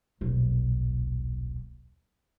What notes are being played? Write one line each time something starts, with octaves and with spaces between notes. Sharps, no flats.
D#1 B1